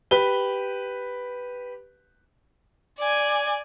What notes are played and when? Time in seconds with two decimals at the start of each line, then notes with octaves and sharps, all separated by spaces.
0.11 G4 B4 G7
2.99 D5 G#5